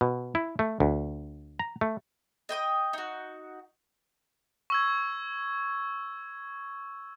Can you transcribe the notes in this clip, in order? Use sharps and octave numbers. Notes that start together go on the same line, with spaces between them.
B2
E4
A3
D2
A#5
A3
D#5 G5 C6 D#6
D#4 F#4
C#6 E6 G#6